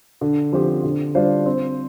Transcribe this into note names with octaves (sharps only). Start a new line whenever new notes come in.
D3
F3 C4 G4
D3
G3 D4 F4 C5
C4